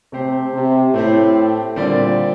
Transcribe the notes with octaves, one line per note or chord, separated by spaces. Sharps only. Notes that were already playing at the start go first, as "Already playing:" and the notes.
C3 A3 C4 G4 C5
C3
A2 A3 C4 G4 C5
A#2 D3 G3 C4 G4 D5